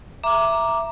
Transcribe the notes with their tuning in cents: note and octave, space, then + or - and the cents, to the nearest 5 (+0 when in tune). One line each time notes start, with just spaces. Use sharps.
E5 +10 A#5 +0 D6 +0